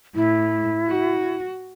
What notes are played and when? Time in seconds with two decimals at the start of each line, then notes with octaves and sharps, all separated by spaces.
0.15 A2 E4
0.88 F#4